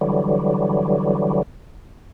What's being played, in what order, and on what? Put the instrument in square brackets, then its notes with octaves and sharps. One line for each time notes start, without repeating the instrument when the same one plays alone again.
[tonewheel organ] D3 E3 F#3 G3